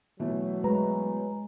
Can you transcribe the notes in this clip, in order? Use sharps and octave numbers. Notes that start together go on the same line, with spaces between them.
B2 E3 F#3 A3
G#3 B4 A#5